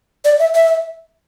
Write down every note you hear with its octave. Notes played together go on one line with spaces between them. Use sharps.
D5
E5
E5